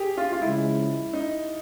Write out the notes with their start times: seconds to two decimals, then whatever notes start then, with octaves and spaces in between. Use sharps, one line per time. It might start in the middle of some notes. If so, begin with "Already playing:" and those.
Already playing: G4 G#4
0.17 F4
0.32 F4
0.42 C#3 F3 G#3 E4
1.13 D#4